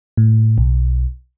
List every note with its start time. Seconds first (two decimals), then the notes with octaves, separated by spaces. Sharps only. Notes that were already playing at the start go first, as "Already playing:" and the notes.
0.17 A2
0.58 B1